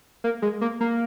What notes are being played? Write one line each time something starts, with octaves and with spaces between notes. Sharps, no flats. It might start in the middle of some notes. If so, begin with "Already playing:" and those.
A#3
G#3
A#3
A#3